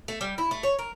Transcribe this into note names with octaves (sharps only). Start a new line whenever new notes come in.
A3
G3
E4
A3
C#5
A#4